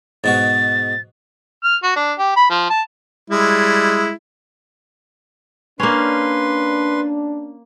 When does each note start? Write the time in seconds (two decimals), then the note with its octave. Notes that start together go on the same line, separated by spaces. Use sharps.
0.24 G#2 B2 F#4 A6
1.63 F6
1.83 F#4
1.96 D4
2.18 G4
2.36 B5
2.50 F3
2.70 A5
3.30 G3 G#3 E4
5.80 A#3 C#4 D4 B4 C6